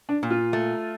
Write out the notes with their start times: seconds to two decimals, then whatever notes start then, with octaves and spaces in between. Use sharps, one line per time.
0.09 D4
0.23 A#2
0.30 F4
0.53 A3